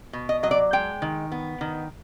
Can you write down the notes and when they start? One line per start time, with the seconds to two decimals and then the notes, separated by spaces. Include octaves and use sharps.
0.13 B2
0.29 D#5
0.43 F#3 D#5
0.51 D5
0.73 G#3 G5
1.02 D#3
1.32 B3
1.61 D#3